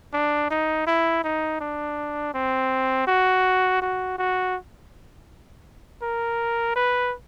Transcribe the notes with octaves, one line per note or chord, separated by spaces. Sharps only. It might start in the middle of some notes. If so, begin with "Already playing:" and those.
D4
D#4
E4
D#4
D4
C4
F#4
F#4
F#4
A#4
B4